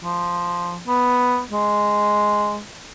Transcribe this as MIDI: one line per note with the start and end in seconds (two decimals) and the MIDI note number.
0.03 0.79 53
0.87 1.41 59
1.51 2.60 56